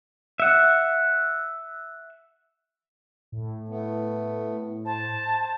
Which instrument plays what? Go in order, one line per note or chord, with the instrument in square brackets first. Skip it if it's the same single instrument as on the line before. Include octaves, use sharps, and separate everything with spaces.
[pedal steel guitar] E5 F#5
[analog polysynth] A2
[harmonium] A3 B3
[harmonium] C5 [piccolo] A5